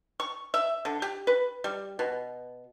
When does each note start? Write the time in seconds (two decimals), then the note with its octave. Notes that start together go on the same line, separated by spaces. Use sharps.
0.20 C#6
0.54 E5
0.85 D3
1.02 G4
1.27 B4
1.64 G3
1.99 B2